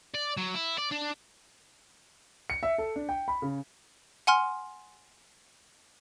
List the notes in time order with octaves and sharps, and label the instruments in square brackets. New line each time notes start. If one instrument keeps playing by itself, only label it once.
[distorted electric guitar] D5
F#3
E4
D5
D4
[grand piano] C#7
E5
A4
D4
G5
B5
C#3
[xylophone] F#5 G#5 C6 F6